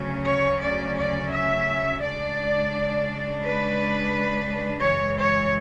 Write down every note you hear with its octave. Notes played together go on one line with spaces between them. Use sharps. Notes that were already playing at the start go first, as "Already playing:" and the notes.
Already playing: D2 C#3 F#3 C#4
C#5
D5
D5
E5
C#3 G#3 D4 D5
B4
F#2 C#3 E3 G#3 C#5
C#5